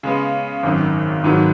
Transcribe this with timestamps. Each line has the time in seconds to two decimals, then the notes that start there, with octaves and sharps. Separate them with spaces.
0.03 C#3 G#3 B3
0.63 G#1 F#2 D#3
1.24 G#1 G#2 D#3 F#3 B3